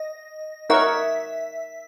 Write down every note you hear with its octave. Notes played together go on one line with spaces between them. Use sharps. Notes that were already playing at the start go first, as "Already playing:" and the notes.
Already playing: D#5
D#4 A#4 C#5 E5 F#5 C#6